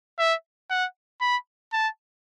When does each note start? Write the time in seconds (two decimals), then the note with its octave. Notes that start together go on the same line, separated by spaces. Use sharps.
0.19 E5
0.70 F#5
1.21 B5
1.73 A5